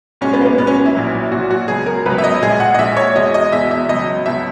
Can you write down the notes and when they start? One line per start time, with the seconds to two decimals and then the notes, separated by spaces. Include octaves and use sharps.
0.21 B1 A#2 G#3 C#4
0.33 B3
0.41 A#3
0.46 B3
0.58 B1 A#2 G#3 B3
0.67 C#4
0.86 E4
0.94 A#1 A#2 F#3
1.31 A#1 A#2 F#3 F#4
1.51 F#4
1.68 C#2 B2 F#3 G#4
1.86 A#4
2.06 C#2 B2 F#3 B4
2.18 E5
2.24 D#5
2.42 A#1 A#2 G#3 G#4
2.60 F#5
2.74 D#5
2.79 A#1 A#2 G#3 E5
2.97 C#5
3.16 E2 B2 G#3 D#5
3.34 D#5
3.52 E2 B2 G#3 E5
3.71 E5
3.89 C#2 B2 F#3 D#5
4.26 C#2 B2 F#3 E5